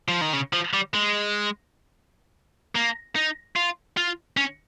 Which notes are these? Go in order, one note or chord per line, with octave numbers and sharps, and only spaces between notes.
F3
D#3
C#3
F3
G3
G#3
A#3
D#4
F4
F4
C#4